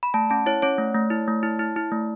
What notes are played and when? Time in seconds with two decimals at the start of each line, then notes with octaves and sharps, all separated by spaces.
0.03 B5
0.14 A3 A5
0.30 C#4 A5
0.46 E4 C#5
0.62 C#4 C#5
0.78 A3
0.95 A3
1.10 E4
1.28 A3
1.43 E4
1.59 E4
1.76 E4
1.92 A3